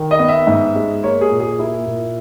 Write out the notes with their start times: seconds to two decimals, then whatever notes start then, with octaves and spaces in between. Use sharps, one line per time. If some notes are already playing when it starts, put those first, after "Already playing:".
Already playing: D#3
0.11 D#5
0.19 B3
0.29 E5
0.47 G#2
0.75 G#3
1.03 A#3 C#5
1.21 G#4
1.31 A#2
1.40 G#4
1.59 A#3 E4
1.86 A#2